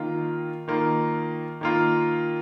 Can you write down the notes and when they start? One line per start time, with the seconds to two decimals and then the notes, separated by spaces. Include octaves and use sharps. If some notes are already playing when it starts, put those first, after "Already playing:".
Already playing: D#3 A#3 F4
0.68 D#3 A#3 F4
1.61 D#3 A#3 F4